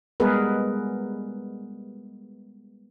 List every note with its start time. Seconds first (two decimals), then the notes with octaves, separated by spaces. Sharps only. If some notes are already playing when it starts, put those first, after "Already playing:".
0.20 G3 G#3 B3 G#4 A#4 B4